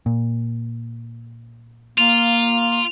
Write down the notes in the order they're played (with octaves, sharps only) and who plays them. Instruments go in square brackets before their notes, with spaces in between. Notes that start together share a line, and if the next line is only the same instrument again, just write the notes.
[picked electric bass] A#2
[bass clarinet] A#3 [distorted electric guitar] F4 [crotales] F7